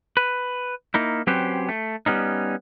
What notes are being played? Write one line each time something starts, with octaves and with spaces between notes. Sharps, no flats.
B4
A#3 D#4 E4
F#3 C4 C#4 G4 B4 C5
A3
G3 B3 C#4 D#4